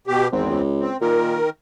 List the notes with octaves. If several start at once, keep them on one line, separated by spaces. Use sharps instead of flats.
B2 G4
G#1 E2 C4
C#2
C4
A#2 D#3 A#4